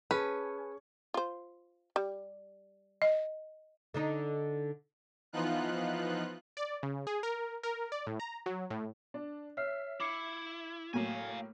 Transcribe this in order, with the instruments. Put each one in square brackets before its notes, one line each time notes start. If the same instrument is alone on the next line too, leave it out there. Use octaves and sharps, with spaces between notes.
[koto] C#4 [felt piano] G#4 A5 [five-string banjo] B4
[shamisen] F4 C5
G3
[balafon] D#5
[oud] D3 D4 D#4
[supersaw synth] E3 F3 B3 D#4 F4 F#6
[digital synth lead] D5
C#3
G#4
A#4
A#4
D5
A2
A#5
F#3
A2
[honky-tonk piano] D4
[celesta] C#5 F6 C7 [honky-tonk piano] E5
[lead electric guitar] E4 [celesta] D6 C7 C#7
[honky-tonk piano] A2 F#3 A#3 [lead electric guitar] F5 G#5